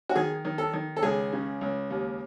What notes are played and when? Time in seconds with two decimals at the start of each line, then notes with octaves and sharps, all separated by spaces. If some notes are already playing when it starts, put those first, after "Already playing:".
0.09 F#4
0.15 D#3 G#4
0.45 D#3
0.58 A4
0.73 D#3
0.96 A4
1.03 C#2 G#4
1.32 C#3
1.61 C#2
1.90 D#2